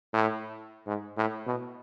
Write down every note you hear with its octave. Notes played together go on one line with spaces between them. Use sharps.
A2
G#2
A2
B2